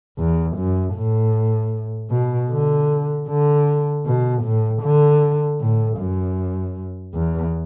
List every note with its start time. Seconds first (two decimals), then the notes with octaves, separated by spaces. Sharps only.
0.18 E2
0.57 F#2
0.95 A2
2.11 B2
2.50 D3
3.28 D3
4.06 B2
4.43 A2
4.83 D3
5.60 A2
5.99 F#2
7.15 E2